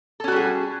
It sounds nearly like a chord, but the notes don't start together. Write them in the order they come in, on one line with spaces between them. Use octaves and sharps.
A4 C#4 F#4 G3 G#4